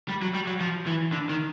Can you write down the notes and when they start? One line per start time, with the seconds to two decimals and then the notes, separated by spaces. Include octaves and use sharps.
0.10 G3
0.23 F#3
0.35 G3
0.47 F#3
0.60 F3
0.86 E3
1.12 D3
1.29 D#3